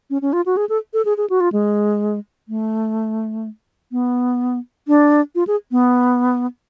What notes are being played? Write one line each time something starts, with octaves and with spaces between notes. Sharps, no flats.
C#4
C#4
F4
F#4
G#4
A4
A4
G#4
G#4
F#4
F4
G#3
A3
B3
D4
F4
G#4
B3